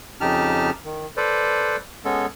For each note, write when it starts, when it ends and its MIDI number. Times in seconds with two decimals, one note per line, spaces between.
0.21 0.70 41
0.21 0.70 49
0.21 0.70 63
0.21 0.70 67
0.21 0.70 81
0.21 0.70 89
0.85 1.07 51
1.17 1.76 69
1.17 1.76 71
1.17 1.76 72
1.17 1.76 74
2.05 2.26 56
2.05 2.26 59
2.05 2.26 61
2.05 2.26 69